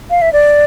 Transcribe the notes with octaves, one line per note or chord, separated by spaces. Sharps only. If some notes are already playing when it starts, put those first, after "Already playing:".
F5
E5
D5